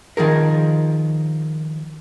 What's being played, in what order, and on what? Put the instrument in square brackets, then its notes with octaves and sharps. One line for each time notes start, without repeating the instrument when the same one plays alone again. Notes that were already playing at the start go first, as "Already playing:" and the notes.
[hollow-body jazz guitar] D#3 F3 G#4 A#4